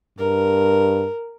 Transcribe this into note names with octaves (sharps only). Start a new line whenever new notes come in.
G2 A#4